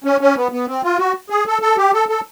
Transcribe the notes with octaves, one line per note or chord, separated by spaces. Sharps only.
C#4
C#4
B3
B3
C4
F4
F#4
G#4
A4
A4
G4
A4
A4